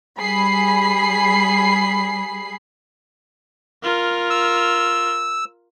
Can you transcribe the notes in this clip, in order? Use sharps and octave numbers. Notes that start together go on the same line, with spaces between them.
G3 G#4 B5 C7
F4 A#4
E6